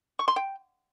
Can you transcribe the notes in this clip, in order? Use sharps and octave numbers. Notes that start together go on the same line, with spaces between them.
C#6
C6
G5